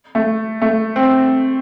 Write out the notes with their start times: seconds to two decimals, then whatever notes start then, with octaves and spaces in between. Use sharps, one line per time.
0.15 A3
0.62 A3
0.96 C4